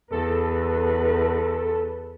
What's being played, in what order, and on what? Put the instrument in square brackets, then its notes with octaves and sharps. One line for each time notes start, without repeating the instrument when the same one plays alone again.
[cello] E2 B4 [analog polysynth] A4